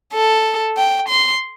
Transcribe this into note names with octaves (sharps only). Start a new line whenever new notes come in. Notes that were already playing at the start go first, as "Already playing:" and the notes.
A4
G5
C6